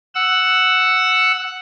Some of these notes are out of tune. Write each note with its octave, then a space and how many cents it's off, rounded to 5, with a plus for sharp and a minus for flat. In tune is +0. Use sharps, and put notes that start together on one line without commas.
F#5 +0 E6 +0